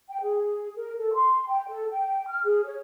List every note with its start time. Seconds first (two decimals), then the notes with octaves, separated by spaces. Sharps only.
0.10 G5
0.22 G#4
0.76 A#4
0.97 A4
1.14 C6
1.48 G5
1.68 A4
1.90 G5
2.28 F6
2.45 G#4
2.65 C#5